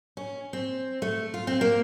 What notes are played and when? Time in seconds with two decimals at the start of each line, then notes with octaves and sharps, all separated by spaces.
0.17 C#4
0.53 C4
1.02 A3
1.34 F4
1.47 C4
1.61 A#3